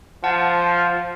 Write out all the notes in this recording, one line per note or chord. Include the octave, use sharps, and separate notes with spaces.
F3 F#5 A5